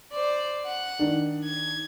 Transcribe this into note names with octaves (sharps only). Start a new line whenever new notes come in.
C5 D5
F#5
D#3 D4
G#6